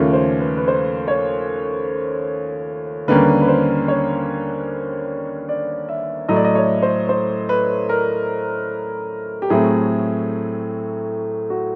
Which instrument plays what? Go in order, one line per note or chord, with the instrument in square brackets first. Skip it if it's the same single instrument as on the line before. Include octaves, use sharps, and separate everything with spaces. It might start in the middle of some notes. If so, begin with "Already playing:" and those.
Already playing: [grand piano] D#2 C#3 F3 A3 C#4
C5
B4
B4
C5
C#5
D#2 D3 G3 A#3 C#4 B4
B4
C5
C#5
D5
E5
A2 F#3 A3 D#5
D5
D#5
C#5
C5
C5
B4
A#4
G4
A2 F#3 A3 C4 G#4
F#4